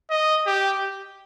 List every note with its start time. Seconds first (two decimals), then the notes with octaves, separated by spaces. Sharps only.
0.10 D#5
0.46 G4